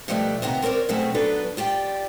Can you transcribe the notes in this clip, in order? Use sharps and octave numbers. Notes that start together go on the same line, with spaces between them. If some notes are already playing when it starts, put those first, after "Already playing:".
B2 F3 G3 A3 D4 G4
D#2 C3 B3 A4 A#5
C4 A#4 B4 C#5 D5
B2 F#3 A3 C4 C#4 G#4
F#3 B3 D4 A4 B4
F4 G4 D5 G5